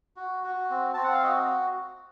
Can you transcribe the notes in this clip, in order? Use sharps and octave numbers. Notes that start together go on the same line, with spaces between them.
F#4
F#4
C4
C4 A5
F#5
F5
F#4 D#5